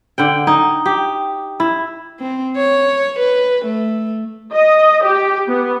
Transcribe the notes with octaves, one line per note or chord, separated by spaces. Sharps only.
D3 F#5 G5
D#4
G4
E4
C4
C#5
B4
A3
D#5
G4
B3